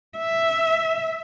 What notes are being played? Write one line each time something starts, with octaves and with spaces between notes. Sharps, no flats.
E5